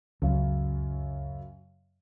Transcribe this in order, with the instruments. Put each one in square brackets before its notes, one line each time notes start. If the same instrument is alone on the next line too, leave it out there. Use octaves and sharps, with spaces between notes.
[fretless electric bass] C#2 [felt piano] F#2 C#3